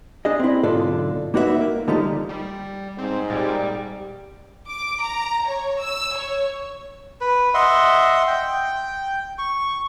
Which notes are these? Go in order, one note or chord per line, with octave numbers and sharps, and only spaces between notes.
D4 G#4 D#5
C4 E4
B1 G#2 D3 F4 A4
A#3 D#4 F#4 B4 C5 E5
A#3
D3 F3 G3 A3 D#4
G3
G#2 C4
A#2 G3
D6
A#5
C#5
E6
C#5
B4
D#5 E5 F#5 C6
G5
C#6